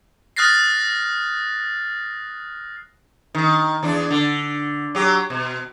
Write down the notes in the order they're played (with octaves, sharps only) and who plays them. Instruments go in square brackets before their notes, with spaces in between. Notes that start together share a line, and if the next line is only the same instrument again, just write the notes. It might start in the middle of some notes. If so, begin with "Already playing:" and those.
[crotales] D#6 F6 F#6 A6 A#6 C7
[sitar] D#3
E2 D4
D3
F#3 G4
B2